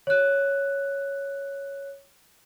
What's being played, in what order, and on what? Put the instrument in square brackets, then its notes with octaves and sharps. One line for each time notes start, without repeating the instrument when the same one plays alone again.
[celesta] C#5 F#6